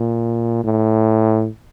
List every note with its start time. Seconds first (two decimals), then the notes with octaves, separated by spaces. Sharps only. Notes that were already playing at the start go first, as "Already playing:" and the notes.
Already playing: A#2
0.64 A2